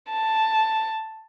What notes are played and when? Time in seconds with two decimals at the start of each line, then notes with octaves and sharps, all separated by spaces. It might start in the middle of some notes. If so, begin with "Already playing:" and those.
0.11 A5